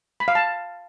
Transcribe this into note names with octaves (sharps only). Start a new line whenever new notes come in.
B5
F5
A5